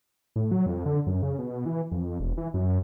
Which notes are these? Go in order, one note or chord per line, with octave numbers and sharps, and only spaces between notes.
A2
F#3
F2
D3
F#2
C#3
B2
E3
F2
E1
E3
F#2